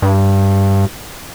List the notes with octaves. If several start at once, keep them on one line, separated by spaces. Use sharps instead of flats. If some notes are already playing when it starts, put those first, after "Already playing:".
G2